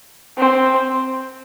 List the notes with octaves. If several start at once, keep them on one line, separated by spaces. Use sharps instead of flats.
C4